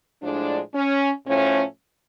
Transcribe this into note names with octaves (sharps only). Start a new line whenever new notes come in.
A2 F3 G#3 D4
C#4
A2 F3 A3 C#4